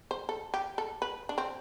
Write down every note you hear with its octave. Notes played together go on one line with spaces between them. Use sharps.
C5
A4
G4
A4
B4
D4
C4